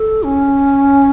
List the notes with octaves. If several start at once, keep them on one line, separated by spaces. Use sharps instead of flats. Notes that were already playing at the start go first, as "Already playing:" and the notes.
Already playing: A4
C#4